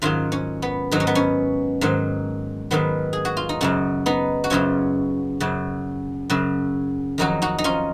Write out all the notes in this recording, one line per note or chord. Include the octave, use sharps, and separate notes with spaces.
G#2 D#3 F#3 C#4 F4
C#4
B3
G#2 D#3 F#3 D#4
C#4
B3
C#4
G#2 D#3 F#3
G#2 D#3 F#3 B3
G#4
F#4
F4
D#4
F#2 C#3 F#3 C#4
B3 D#4
F#4
F#2 C#3 F#3 C#4 F4
F#2 C#3 F#3
F#2 C#3 F#3
F2 D#3 F#3 D#4 F#4
D#4 F#4
D#4
C#4 F4